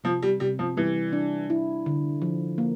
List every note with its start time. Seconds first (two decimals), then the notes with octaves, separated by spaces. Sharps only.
0.04 C3 F3
0.22 G3
0.40 C3 G3
0.59 F3
0.77 E3 G3
1.13 D4
1.50 E4
1.86 D3
2.22 F3
2.58 A#3